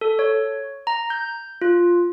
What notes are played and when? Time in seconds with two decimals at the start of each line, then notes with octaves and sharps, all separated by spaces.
0.01 A4
0.19 C#5
0.87 A#5
1.10 G6
1.61 F4